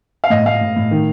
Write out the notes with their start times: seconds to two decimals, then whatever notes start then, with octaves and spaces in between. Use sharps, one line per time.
0.24 F5
0.30 A2 D#5
0.46 A2 F5
0.61 A2
0.76 A2
0.91 D#3